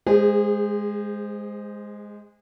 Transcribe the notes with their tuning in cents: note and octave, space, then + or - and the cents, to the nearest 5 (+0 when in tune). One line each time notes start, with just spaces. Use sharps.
G#3 +0 G#4 -35 C5 -10